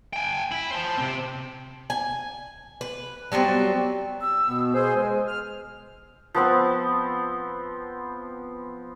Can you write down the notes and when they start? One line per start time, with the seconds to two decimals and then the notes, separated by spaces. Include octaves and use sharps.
0.14 G5 G#5
0.52 E4
0.71 C5 A5
0.97 C3 C4
1.90 G#5
2.81 B4
3.32 F#3 G3 B3 C4
4.21 E6
4.48 B2 B3
4.74 B2 G#4 C5 G#5
4.95 G#3
5.27 F6
6.34 F3 B3 C4